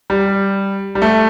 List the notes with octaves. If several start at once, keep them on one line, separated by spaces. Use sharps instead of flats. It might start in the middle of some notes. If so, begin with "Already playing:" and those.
G3
G3
A3